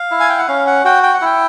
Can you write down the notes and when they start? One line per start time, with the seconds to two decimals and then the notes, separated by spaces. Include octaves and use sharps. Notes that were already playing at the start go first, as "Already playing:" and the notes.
Already playing: F5
0.11 E4
0.20 G#5
0.29 G5
0.38 F#5
0.48 C#4 F5
0.67 F#5
0.85 F#4 G5
1.03 G5
1.14 F#5
1.22 E4 G5